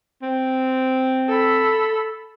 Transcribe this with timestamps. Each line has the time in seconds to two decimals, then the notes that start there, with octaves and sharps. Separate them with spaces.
0.22 C4
1.29 A4 B5